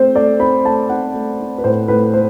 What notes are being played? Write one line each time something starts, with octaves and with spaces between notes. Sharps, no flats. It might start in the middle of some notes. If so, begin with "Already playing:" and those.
Already playing: A3 C4 C5
A3 D5
C4 B5
A3 A5
C4 F#5
A3
C4
B4
A2 C5
A2 B4
A3 C5